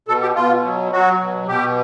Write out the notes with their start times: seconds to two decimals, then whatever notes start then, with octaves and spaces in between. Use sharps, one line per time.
0.08 B2 A4
0.22 G4
0.35 B2 F4
0.64 F#3
0.92 F#3 F#4
1.20 B2
1.48 B2 G4